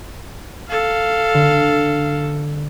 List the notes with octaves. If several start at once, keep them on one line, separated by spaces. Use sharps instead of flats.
A4 F5
D3